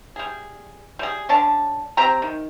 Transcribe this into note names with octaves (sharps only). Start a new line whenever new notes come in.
G3 G#4
G3 G#4
D3 C#4 D4 A5
C4 G4 A#5
D#3